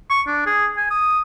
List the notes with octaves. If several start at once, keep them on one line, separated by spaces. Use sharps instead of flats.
C#6
D4
G#4
G#5
D#6